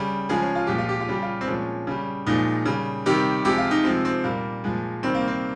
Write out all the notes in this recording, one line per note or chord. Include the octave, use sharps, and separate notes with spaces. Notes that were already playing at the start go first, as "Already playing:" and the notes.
Already playing: C#3 G3
C#3 F3 G#3 G#4
C#4
F4
A#2 F3 G#3 G4
F4
G4
F4
C#3 G3 G4
F4
C4
A#2 F3 G#3 C#4
C#3 G3
A#2 F3 G#3 D#4
C#3 G3
C3 D#3 G3 G4
C3 F3 G#3 G4
F4
D#4
C3 F3 G#3 C4
C4
A#2 G3 A#3
A#2 F3 G#3
C3 D#3 G3 C4
A#3
C4